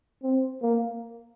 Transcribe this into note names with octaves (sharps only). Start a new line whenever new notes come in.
C4
A#3